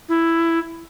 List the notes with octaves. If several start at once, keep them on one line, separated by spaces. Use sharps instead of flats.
E4